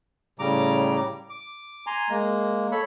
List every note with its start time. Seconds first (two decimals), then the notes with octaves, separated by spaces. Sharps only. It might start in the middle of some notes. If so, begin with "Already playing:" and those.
0.39 A2 C#3 G3 A#5 D6
1.29 D6
1.87 G#5 A#5 C6
2.10 G#3 A#3
2.72 A4 C#5 B5